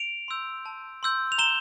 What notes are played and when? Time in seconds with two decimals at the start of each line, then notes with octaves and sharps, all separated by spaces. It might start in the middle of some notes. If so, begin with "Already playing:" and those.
Already playing: D7 F7
0.28 C6 E6 G6
0.66 A5
1.03 C6 E6 G6
1.32 F7
1.38 A#5 E7 G7